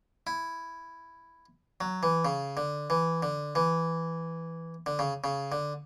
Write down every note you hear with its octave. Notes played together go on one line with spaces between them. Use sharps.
E4
F#3
E3
C#3
D3
E3
D3
E3
D3
C#3
C#3
D3